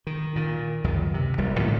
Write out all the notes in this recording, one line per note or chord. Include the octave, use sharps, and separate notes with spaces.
D#3
A#2 D#3
C#2 F#2 D#3
C3
D#1 A#1 G3
A2 D3 F3 G3